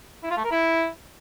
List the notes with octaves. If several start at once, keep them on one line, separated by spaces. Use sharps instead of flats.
E4
F4
A3
A#4
E4